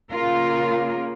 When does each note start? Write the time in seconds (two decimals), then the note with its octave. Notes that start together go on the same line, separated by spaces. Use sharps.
0.11 C#3 A#3 F4 A#4